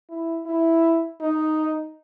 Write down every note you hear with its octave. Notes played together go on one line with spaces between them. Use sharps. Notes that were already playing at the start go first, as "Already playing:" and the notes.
E4
E4
D#4